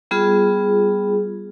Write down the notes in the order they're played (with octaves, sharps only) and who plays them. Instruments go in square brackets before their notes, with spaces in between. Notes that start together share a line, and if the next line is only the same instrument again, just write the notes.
[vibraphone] G3 B3 F4 G#4